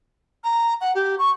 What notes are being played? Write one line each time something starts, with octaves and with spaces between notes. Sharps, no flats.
A#5
F#5
G4
C#6